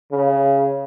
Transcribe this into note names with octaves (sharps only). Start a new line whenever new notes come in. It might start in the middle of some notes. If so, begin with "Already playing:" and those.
C#3